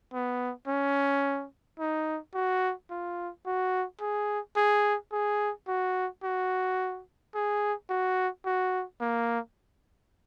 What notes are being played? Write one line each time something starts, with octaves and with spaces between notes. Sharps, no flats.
B3
C#4
D#4
F#4
F4
F#4
G#4
G#4
G#4
F#4
F#4
G#4
F#4
F#4
A#3